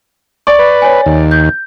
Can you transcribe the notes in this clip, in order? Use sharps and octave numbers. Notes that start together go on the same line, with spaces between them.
D5 C#6
B4
C#5 G#5
D#2
G6